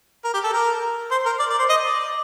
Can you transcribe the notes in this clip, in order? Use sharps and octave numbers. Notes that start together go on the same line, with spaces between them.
A#4
G4
A4
A#4
C5
A#4
D5
D5
C5
D#5
D5